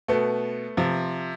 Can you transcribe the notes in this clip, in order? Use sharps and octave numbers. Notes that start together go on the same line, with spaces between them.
B2 A3 B3
C3 F3